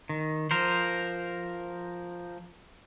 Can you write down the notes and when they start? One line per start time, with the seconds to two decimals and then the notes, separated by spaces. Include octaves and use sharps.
0.09 D#3
0.51 F3 A#4 C5